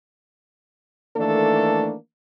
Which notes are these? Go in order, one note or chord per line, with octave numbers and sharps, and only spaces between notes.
D#3 E3 A3 A#3 D4 A4